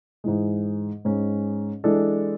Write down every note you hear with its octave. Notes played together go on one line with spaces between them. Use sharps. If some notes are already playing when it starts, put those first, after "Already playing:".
G#2 E3 G#3
G#2 G#3 C#4
E3 G#3 D4 A4